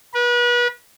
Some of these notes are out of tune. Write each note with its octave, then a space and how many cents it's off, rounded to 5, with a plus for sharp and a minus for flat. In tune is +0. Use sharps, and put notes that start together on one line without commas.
B4 -35